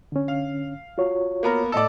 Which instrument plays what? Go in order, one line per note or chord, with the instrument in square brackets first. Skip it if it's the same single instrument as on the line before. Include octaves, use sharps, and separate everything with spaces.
[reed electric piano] D3 C#4
[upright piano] F5
[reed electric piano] F4 F#4 C#5
[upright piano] A#3 B3 A#4
[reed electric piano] A2 D#5 E6 [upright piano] A4 D5